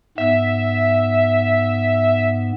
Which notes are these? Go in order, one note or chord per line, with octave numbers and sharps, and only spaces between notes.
G#2 B3 E5